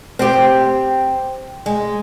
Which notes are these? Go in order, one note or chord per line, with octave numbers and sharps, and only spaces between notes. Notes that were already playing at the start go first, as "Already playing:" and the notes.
C4 G4
G#3